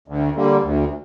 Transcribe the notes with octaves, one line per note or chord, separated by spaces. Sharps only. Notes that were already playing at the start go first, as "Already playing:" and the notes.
D2
D3 G3 A#3
D2